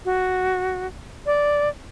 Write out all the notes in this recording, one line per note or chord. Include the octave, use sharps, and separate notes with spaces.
F#4
D5